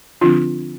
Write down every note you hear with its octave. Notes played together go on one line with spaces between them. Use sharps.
D3 F3 C4 D4 F4